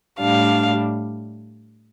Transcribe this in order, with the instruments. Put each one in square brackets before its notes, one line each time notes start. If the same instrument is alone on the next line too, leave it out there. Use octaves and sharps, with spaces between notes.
[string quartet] A2 G3 D4 F5